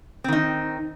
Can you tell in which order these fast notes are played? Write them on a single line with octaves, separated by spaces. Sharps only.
C4 D#3 D#4